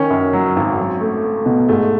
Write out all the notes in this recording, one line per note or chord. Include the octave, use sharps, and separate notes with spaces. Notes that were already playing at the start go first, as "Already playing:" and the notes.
Already playing: D#3 C#4
F#2
F#3
G#1
F#3
A3
A3
B2
G#2 A3